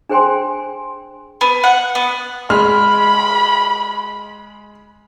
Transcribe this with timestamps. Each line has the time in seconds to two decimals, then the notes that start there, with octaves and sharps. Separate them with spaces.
0.09 D4 G#4 C5 G5 G#5 C6
1.41 B3
1.64 F#5
1.95 B3
2.50 G#3 B5 F6